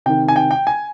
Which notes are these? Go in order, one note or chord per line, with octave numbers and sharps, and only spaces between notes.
C3 D#3 G5
G#5
G5
G5
G#5